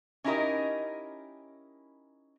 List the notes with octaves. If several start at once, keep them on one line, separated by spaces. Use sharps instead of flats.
C#4 D#4 E4 G4 A#4 D#5